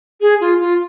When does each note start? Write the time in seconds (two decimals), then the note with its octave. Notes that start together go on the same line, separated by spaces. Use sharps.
0.21 G#4
0.41 F4
0.60 F4